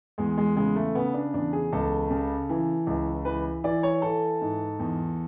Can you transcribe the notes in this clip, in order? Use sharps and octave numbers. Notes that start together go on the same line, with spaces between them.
E2 G#3
G#3
C#3 G#3
A3
C#3 B3
D4
E2 D4
G#4
C#2 A4
C#3
E3
C#2
E3 B4
E3 D5
C#5
E3 A4
G#2
E2